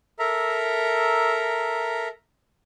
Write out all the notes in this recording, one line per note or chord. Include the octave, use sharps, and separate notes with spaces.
A4 A#4 E5 A#5